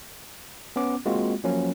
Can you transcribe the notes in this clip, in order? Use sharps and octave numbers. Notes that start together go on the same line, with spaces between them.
B3 C#4 D6
G#3 A#3 C4 F4 F#4
F3 F#3 A#3 C#4